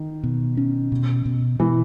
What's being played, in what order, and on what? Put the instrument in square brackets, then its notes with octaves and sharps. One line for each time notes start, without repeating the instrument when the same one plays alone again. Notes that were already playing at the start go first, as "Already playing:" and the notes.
Already playing: [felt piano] D#3
[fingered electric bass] B2
C#4
B2
B2
[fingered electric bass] B2 [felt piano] E3